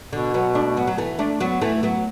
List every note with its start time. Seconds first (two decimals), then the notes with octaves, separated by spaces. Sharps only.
0.12 B2 D3
0.34 F#3 B3
0.55 A3 D4
0.77 F#3 B3
0.87 F#3
0.98 E3 A3
1.19 A3 D4
1.40 F#3 B3
1.61 E3 A3
1.83 F#3 B3